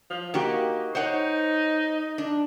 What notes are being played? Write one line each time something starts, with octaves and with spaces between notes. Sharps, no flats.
F3
A#3 D#4 F#4 G4
D#4 C5 C#5 F#5
D4